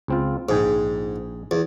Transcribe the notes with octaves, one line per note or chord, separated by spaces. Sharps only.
C#2 C4 F4
A#1 G#2 G#4 G5
E2